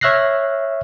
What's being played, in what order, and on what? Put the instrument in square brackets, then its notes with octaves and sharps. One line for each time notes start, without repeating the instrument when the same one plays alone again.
[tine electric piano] C#5 E5 F6 F#6 A#6 C7